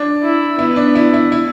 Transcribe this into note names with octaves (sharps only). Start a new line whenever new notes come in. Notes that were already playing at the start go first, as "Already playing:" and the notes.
Already playing: D4
E4
B3 E4
D4
E4
E4
E4